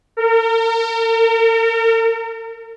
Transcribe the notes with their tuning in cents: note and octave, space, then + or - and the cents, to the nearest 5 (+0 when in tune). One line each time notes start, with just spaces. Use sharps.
A#4 -35